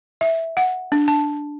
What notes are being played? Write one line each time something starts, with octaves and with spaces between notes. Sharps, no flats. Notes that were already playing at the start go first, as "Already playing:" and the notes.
E5
F#5
D4
A5